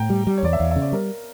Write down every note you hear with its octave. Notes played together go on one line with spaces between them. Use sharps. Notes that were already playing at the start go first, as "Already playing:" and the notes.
Already playing: A2 G5 A#5
G3
G3
C#5
E2 D5
E5
E2 F5
E5
C#3
D5
G3 A#4